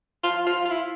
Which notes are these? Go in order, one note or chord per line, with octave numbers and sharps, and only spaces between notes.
F4
F4
F4
E4